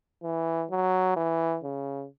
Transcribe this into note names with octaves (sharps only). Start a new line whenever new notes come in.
E3
F#3
E3
C#3